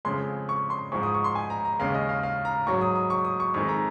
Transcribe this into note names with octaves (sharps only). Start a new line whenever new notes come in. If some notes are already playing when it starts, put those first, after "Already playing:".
F2 C#3 F3 G#3 C6
C#6
C6
G#2 F3 G#3 C#6
D#6
C#6
C6
G#5
A#5
A#5
D#2 C#3 G#3 F5
D#5
F5
F5
A#5
G#2 F#3 C#6
D#6
D#6
C#6
D#6
C#6
F2 D#3 G#3 C#6
A#5